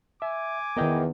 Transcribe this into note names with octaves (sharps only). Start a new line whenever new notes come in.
E5 G#5 D6
E2 D#3 B3 A#4 D#5 G5